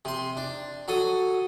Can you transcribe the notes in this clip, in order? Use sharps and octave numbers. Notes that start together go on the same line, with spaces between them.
C3 C6
D4
F#3 A4 D#6